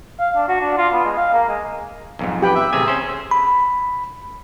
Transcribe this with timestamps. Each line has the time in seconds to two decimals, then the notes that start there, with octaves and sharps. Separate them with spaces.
0.19 F5
0.36 D4
0.48 F#4
0.61 D4
0.77 F4
0.93 B3
1.05 G#3
1.17 F5
1.33 A#3
1.48 G#3
2.19 B1 F2 G#2
2.42 G4 B4 G5
2.55 E5
2.73 A1 C3 G#4 G#5 E6
2.88 C#4 C5
3.31 B5